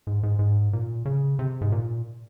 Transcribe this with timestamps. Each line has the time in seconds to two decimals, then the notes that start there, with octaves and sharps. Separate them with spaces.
0.07 G#2
0.23 G#2
0.39 G#2
0.73 A#2
1.05 C#3
1.39 C3
1.61 G#2
1.72 A#2